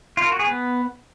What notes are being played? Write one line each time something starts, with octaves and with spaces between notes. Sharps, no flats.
F4
A#4
F#4
G#4
B3